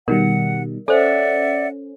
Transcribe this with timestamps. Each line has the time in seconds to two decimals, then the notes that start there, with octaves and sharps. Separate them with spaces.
0.08 B2 D#3 G3 A#4 F#5
0.88 C#4 A4 C5 D5 E5 F#5